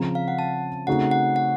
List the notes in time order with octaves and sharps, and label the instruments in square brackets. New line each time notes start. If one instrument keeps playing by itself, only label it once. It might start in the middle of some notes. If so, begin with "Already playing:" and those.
Already playing: [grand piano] C#3 F3 C4 [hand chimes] A#5
[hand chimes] F5
F#5
A5
[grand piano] C#3 A3 C4 D#4 F#4 [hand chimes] F#5
[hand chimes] F#5
F#5